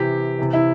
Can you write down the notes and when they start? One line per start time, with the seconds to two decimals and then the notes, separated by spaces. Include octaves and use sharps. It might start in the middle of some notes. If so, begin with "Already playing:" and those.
Already playing: C3 E3 G4
0.39 C3 E3
0.53 E4